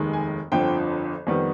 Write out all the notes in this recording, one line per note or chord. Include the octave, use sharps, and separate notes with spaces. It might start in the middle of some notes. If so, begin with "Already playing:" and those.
Already playing: F1 D#2 D#3 G#3
G#5
G1 F2 D3 F3 G5
F2 D#3 G3 B3